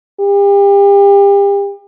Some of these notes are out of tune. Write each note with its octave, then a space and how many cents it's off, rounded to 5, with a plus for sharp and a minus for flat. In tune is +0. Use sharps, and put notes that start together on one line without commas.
G4 +35